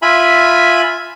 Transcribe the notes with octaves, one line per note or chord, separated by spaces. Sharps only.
F4 E5 G#5 B5